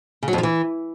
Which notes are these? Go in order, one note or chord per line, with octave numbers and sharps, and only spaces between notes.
C#3
F#3
F2
F3
E3